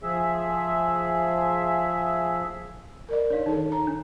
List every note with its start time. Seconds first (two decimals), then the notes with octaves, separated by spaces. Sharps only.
0.03 F3 G#4 E5
3.09 A#4 D5 D#5
3.30 D4 D#4 C#5 F5
3.46 D#3 D#4 G#4 A4
3.72 A#5
3.87 D4